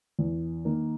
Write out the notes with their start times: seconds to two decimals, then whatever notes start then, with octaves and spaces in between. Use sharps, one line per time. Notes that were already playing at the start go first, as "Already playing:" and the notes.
0.19 E2
0.65 D#3 A#3